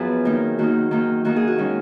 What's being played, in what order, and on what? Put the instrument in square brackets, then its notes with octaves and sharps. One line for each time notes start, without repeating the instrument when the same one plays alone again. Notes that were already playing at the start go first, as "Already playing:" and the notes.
Already playing: [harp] F#2 F3 B3 G#4 B4
D#3 A#3 D#4
D#3 A#3 D#4 F#4
D#3 A#3 D#4
D#3 A#3 D#4 F#4
G#4
F#4
D#3 G#3 C#4